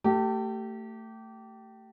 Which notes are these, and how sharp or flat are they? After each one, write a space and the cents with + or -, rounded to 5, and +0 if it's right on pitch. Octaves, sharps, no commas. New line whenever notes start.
A3 +25 G4 -20